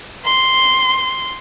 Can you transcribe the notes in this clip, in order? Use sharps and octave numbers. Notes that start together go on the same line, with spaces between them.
C6